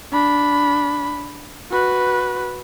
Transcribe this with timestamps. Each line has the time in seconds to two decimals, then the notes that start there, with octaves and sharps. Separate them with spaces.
0.12 D4 B5
1.71 F#4 B4